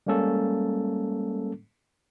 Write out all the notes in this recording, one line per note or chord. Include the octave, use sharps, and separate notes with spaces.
G3 G#3 A#3 C#4 A4